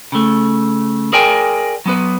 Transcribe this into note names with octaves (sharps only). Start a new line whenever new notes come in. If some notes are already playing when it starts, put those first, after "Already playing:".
C#3 A3
G#4 A#4 D5 G5 G#5
F#3 B3 B4